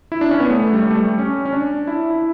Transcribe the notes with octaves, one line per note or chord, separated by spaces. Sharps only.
E4
D4
C#4
B3
A3
G3
A3
G3
C#4
C#4
D4
E4
E4